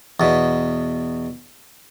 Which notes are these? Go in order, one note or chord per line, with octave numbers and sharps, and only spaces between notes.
E2 B2